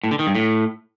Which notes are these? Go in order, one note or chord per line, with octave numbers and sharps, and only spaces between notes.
A2
D3
D#3
G2
A2